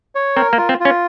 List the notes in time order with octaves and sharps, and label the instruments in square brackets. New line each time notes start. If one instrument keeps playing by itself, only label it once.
[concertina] C#5
[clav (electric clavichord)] C4 [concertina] A#4
[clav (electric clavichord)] A#3
[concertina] F4
[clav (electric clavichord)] C4
[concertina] F4
[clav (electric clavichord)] C#4